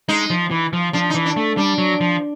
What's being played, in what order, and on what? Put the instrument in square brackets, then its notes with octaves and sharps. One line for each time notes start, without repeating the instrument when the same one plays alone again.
[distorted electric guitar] G#3 [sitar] D#4
[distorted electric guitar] F3
E3
F3
[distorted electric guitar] F3 [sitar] D4
[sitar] D#4
[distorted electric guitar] E3
[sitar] D4
[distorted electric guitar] A3
[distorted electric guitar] G3 [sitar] D4
[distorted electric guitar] F#3
F3